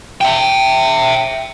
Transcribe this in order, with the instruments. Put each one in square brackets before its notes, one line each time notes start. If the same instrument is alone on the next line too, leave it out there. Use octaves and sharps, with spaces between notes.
[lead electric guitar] E5 G5